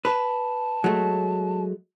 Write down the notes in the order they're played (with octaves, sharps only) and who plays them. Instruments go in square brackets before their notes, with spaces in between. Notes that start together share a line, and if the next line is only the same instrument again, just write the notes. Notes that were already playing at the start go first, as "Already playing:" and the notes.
[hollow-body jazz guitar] B4 [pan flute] A5
[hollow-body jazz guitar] F#3 G#3 A3